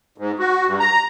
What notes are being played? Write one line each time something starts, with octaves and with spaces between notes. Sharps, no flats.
G#2
F#4
G2
A#5